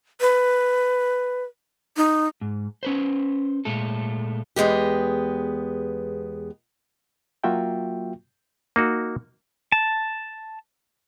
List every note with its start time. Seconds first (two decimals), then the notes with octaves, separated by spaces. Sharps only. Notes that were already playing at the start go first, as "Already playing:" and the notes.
0.21 B4
1.97 D#4
2.41 G#2
2.83 C#4 B4 C5
3.65 A#2 G#3 A3 A4
4.56 E2 G#3 B3 G4
7.44 F#3 A#3 F4 F#4 E5 G5
8.76 A#3 D#4 F#4
9.72 A5